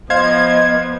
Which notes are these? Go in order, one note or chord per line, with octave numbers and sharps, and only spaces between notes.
F3 B3 C5 D#5 F5 G#6